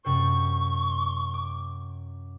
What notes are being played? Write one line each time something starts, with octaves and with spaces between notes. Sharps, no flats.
F#2 C3 C5 C#6
D6